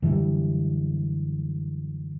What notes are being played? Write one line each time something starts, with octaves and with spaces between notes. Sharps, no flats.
F#2 D3 E3 G3